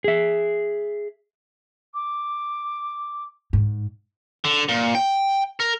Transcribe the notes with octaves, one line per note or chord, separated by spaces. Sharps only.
G#4 E5
D6
G#2
D3
A#2
G5
A#4